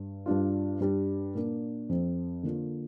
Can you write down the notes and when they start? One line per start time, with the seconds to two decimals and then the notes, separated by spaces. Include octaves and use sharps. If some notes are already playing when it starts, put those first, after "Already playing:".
Already playing: G2
0.26 G2 G3 D4 F4
0.80 G2 G3 D4
1.35 A#2 A#3 D4
1.89 F2 F3 C4
2.43 D3 A#3 D4 F4